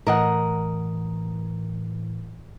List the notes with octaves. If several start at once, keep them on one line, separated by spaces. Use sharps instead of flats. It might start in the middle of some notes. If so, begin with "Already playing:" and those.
A2 E3 A#4 D#5 F#5